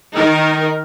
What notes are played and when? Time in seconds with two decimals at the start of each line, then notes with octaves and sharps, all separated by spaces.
0.15 D#3 D#4 A#4